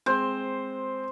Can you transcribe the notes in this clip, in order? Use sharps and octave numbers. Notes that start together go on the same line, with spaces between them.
G#3 C4 C5